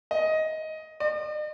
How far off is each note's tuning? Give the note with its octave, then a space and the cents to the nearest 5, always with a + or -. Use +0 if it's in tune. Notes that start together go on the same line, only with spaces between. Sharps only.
D#5 +15
D#5 -45